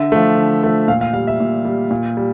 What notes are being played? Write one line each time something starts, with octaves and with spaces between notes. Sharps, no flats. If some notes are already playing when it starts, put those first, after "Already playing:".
Already playing: D3 E5
F3 A3
D3
F3 A3
A#2 F5
F5
G3 F5
E5
A#2
G3
A#2
G3